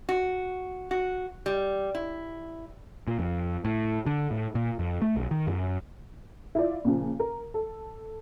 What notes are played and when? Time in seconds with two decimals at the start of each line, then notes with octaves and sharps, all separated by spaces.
0.09 F#4
0.91 F#4
1.46 G3
1.95 E4
3.07 A#2
3.19 F2
3.65 A2
4.06 D3
4.31 A2
4.55 A#2
4.79 F2
5.02 A3
5.16 B1
5.31 D#3
5.47 F#2
6.55 E4 F4 D5
6.85 A#2 C#3 F3
7.20 A#4
7.54 A4